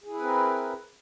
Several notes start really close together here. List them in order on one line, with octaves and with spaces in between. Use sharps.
G#4 E4 B4 C4 A#4